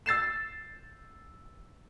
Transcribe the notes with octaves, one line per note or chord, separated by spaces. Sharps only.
E6 A6 C7 E7